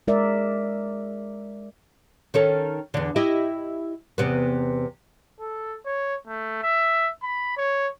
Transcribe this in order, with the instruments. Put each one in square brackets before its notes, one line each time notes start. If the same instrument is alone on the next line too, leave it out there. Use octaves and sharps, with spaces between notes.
[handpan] G#3 A#4 D5 E5
[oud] D#3 C#4 A4
E2 D3
E4 G4 D#5
E2 C3 B3
[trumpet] A4
C#5
A3
E5
B5
C#5